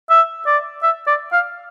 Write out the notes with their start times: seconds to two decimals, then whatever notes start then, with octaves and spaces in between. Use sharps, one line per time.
0.10 E5
0.46 D5
0.83 E5
1.07 D5
1.32 F5